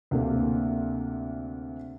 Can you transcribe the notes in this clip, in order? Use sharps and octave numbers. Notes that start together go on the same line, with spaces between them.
D2 C3 A#3